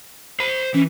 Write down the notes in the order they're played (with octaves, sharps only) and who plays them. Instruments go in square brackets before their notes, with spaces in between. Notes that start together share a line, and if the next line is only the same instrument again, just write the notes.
[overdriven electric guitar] C5 B5
[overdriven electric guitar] E3 [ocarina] C#4